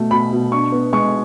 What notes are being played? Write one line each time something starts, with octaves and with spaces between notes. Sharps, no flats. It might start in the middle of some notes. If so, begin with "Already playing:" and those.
Already playing: B2 A3
B2 B5
B2
D4 C#6
B3
G#3 C#6